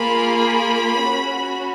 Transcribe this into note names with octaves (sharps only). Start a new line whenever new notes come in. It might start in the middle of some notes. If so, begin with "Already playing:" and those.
Already playing: A#3 F4 G#4 B5
B5
C#4 F#4